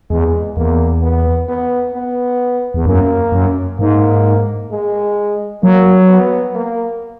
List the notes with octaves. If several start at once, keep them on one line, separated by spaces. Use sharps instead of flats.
E2 G#3
E2 A#3
B3
B3
B3
E2
F#2 A#3
F#2
G#2 A#3
G#3
F#3 A#3
B3
A#3